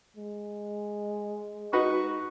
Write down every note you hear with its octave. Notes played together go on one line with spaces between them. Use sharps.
G#3
D#4 F#4 B4 C#6